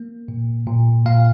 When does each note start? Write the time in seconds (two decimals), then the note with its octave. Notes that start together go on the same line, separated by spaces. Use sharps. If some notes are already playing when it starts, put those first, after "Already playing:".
Already playing: A#3
0.28 A#2
0.67 A#2
1.06 A#2 F5